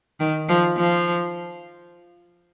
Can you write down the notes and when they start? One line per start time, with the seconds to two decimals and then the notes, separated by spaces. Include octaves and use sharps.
0.20 D#3
0.49 F3
0.77 F3